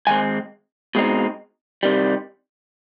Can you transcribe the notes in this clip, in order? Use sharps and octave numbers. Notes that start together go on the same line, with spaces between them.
G#2 D#3 G#3 C4 G#5
B2 G#3 C4 D#4
C3 D#3 G3